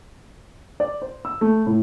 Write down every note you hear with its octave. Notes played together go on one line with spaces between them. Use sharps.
D5
C5
E6
A3
A2